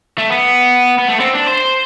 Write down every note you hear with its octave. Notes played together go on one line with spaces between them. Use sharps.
A3
B3
B3
A3
C4
D4
C5